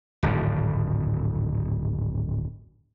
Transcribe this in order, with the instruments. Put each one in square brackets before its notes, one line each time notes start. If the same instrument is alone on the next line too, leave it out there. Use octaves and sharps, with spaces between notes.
[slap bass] D1 G#1 F2